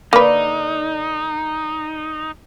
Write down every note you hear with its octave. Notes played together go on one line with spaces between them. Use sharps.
D3 A#3 D#4 B4 D5